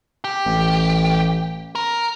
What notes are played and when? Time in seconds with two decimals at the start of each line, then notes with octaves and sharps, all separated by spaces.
0.24 G4
0.46 A1
1.75 A#4